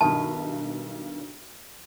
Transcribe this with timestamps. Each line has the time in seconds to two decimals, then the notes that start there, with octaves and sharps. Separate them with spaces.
0.01 B1 G2 D#3 E4 A5